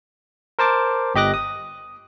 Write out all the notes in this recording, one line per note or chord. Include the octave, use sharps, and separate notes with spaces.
A#4 C5 A5 D6
G1 G4 D#5 D6 F#6 A#6
D#6